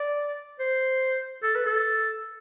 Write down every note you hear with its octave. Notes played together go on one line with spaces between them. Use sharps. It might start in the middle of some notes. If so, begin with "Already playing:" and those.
Already playing: D5
C5
A4
B4
A4